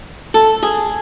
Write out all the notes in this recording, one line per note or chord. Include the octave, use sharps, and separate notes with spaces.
A4
G#4